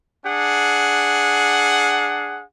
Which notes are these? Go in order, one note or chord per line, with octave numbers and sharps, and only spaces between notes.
D4 G#4 F#5